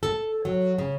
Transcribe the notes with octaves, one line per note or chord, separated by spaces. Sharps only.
A4
F#3
C#3